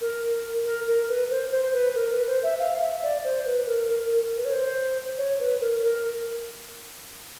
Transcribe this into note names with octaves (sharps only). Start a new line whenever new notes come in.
A#4
A#4
A#4
B4
C5
C5
B4
A#4
B4
C5
E5
F5
E5
D5
C5
B4
A#4
A#4
A#4
A#4
B4
C#5
C5
C#5
B4
A#4
A#4